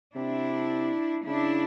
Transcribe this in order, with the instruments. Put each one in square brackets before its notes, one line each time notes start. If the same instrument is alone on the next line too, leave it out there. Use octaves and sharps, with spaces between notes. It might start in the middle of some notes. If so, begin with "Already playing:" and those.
[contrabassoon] C3 [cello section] D4 E4
[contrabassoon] C#3 [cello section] D4 E4